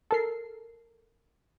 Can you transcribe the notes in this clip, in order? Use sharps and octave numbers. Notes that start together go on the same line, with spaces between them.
A4 A#4 C7